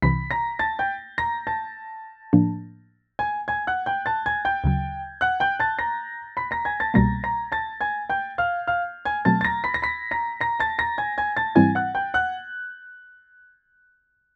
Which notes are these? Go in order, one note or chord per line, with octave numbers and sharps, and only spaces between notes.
C2 C3 E3 B5 B6
A#5 A#6
A5 A6
G5 G6
A#5 A#6
A5 A6
A2 F3 A#3 D4
G#5 G#6
G#5 G#6
F#5 F#6
G5 G6
A5 A6
G#5 G#6
G5 G6
D2 C#3 F#3
F#5 F#6
G5 G6
A5 A6
A#5 A#6
B5 B6
A#5 A#6
G#5 G#6
A5 A6
C2 B2 G3 A#3 A#5 A#6
A#5 A#6
A5 A6
G#5 G#6
G5 G6
F5 F6
F5 F6
G#5 G#6
B2 F#3 A3 C4 A5 A6
A6
A#5 A#6
B5 B6
A#6
B5 B6
A#5 A#6
A#5 A#6
A5 A6
A#5 A#6
G#5 G#6
G#5 G#6
A5 A6
G#2 E3 G3 C4 E4 G#5 G#6
F#5 F#6
G5 G6
F#5 F#6